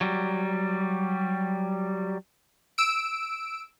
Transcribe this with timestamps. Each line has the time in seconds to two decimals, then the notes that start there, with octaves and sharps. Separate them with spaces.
0.01 F#3 G3
2.78 E6 D7